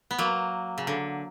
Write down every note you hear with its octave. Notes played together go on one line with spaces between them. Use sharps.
B3
F#3 A#3
C#3
D3